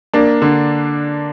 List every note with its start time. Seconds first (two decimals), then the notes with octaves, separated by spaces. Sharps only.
0.14 A#3 D4
0.42 D3